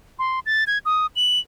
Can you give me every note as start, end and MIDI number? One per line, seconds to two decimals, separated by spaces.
0.19 0.40 84
0.46 0.64 93
0.67 0.78 92
0.85 1.06 87
1.16 1.39 102